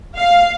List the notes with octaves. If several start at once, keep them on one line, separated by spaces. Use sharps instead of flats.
F5